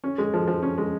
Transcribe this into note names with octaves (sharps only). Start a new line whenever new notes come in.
C#4
G#3
F3
F3
C#4
G#3